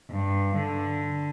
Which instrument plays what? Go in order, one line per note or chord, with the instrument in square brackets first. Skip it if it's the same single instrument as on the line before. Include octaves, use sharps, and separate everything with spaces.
[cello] G2
D3